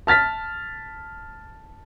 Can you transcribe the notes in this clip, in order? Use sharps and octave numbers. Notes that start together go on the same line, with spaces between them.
A5 F6 A6 B6